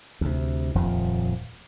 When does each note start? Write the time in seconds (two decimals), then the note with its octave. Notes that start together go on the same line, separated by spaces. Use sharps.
0.21 D2 C3
0.75 D#1 F2 A#2 F3